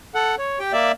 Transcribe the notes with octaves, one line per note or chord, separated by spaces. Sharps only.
A4 F#5
C#5
G4 G5
A#3 D5 E5